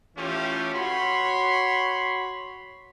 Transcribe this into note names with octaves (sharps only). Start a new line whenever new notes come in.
E3 A3 C#4 F4 G4
F#4 C#5 B5 C6